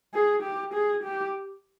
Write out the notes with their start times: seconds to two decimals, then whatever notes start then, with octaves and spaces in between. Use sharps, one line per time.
0.14 G#4
0.43 G4
0.74 G#4
1.04 G4